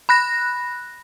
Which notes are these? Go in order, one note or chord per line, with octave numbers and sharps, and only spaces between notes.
B5 F#6 A#6